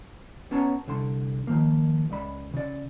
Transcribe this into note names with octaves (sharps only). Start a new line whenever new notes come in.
B3 C#4 C#5 A5 A#5
C2 D3 A5 C6
D#3 F3 A#3
C#2 G#3 D5 B5
C#3 D5